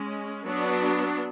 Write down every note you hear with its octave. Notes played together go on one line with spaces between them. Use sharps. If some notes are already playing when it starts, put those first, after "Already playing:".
Already playing: G#3 C#4
F#3 B3 D4